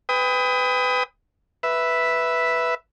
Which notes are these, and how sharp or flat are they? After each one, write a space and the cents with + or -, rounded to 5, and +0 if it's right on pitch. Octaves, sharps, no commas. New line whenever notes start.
B4 +25 G5 +30 D#6 +25
B4 +0 E5 +0